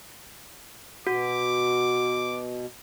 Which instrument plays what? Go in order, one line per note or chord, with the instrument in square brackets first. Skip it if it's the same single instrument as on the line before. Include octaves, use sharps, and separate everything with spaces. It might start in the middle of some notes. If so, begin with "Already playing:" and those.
[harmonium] B2 [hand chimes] F#4 [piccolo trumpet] D6